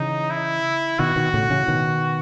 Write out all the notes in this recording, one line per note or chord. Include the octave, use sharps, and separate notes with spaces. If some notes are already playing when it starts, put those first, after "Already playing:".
Already playing: C#3 E3 D#4
E4
B2 D#3 F#4
B2 D#3
A2 C#3
C#3 E3
B2 D#3